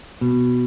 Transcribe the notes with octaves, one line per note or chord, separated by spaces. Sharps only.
B2